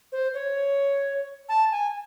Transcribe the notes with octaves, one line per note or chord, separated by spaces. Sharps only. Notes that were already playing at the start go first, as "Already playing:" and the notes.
C5
C#5
A5
G#5